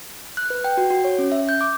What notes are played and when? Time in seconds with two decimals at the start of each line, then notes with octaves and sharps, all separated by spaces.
0.37 F#6
0.50 B4
0.64 G5
0.77 F#4
0.90 F#4
1.04 C#5
1.19 C#4
1.32 E5
1.49 G6
1.61 D6